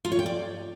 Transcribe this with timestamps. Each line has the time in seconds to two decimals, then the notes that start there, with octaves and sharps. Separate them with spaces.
0.05 F4
0.12 C#5
0.19 G5
0.26 D5